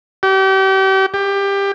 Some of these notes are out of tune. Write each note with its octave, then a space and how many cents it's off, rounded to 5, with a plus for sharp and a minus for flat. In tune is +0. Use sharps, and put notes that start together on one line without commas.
G4 -35
G4 +20